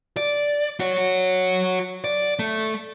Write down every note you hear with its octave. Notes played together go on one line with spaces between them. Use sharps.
D5
F#4 C#5
D5
A3